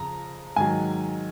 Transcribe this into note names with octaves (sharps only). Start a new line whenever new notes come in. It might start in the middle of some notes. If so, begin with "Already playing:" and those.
Already playing: F2 C#3 F3 A#5
G#2 D#3 F#3 G#5